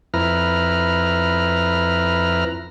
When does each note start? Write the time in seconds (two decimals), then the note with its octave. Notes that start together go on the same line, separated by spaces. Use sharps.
0.14 F2 E4 B4 A#5 F6